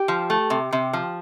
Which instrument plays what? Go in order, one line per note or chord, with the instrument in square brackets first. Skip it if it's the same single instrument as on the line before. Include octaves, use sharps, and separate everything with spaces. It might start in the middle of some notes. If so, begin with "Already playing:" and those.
Already playing: [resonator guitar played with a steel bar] G4
F3
A3
C3
C3
F3